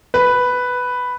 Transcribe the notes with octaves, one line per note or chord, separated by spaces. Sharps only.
B4